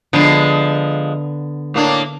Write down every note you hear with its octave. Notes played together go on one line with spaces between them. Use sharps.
D3 F3 G#3 B3
A2 A#3 D4